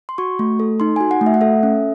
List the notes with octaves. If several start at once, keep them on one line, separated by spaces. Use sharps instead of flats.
C6
F#4 C#6
A3
A4
D#4 C6
F#4 G#5
F#5
A3
E5
F#5
A4 E5
C#4